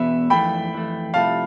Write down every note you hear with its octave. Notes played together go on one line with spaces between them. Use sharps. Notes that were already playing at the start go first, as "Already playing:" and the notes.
Already playing: E2 B2 B3 E5
F2 E3 A3 G5 B5
F2 E3 A3
C2 C3 F3 A3 E4 F5 A5